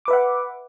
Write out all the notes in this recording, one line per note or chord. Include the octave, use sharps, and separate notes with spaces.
B4 E5 F#5 D6